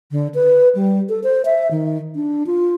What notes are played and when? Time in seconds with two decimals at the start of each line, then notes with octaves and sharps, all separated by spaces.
0.11 D3
0.34 B4
0.75 G3
1.09 A4
1.24 C5
1.45 E5
1.71 D#3
2.15 D4
2.47 F4